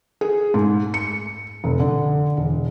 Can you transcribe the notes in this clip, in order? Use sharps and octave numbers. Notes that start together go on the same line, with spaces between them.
G#4
G#2
C#7
F1
D3
E1